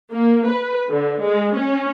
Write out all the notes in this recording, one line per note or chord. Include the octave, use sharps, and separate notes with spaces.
A#3
B4
D3
G#3
C#4